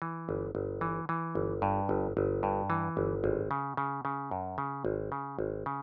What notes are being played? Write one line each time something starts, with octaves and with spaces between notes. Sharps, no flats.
E3
G1
G1
E3
E3
G1
G2
G1
G1
G2
E3
G1
G#1
C#3
C#3
C#3
F#2
C#3
G#1
C#3
G#1
C#3